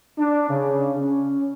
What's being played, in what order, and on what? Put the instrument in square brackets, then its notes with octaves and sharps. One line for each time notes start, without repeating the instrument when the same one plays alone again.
[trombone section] D4
C#3
C#4